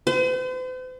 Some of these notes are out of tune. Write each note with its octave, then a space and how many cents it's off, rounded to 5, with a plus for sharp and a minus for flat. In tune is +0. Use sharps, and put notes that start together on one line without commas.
C5 -45